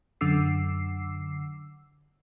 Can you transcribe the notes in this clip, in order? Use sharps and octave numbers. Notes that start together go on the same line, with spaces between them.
F#2 D3 D6 E6 C7